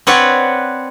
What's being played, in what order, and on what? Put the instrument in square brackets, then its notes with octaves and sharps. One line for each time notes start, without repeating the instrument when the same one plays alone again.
[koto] C4 B4 C#5 D5 F#5